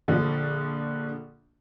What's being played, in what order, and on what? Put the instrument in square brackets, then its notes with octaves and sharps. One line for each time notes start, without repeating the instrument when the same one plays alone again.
[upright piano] A#1 D3 F3